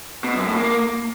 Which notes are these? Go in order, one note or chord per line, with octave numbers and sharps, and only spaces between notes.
B2
F#2
A2
A#3